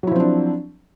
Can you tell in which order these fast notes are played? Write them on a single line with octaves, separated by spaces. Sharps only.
F#3 E4 F3 C4 D4